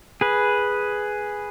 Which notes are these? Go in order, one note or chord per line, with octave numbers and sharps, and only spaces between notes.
G#4 B4